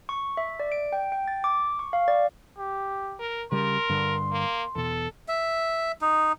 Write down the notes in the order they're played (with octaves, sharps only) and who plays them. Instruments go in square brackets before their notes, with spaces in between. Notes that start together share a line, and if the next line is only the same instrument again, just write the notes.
[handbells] C#6
E5
D5
D7
G5
G5
A6
D6
C#6
F5
D5
[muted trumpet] G4
[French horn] A#4
[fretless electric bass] C#3 G3 [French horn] A#4 [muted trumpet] C6
[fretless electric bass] G2 D3
[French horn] A#3
[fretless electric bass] E2 B2 [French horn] A4
[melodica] E5
D#4